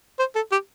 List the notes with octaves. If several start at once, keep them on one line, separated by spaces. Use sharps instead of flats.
C5
A4
G4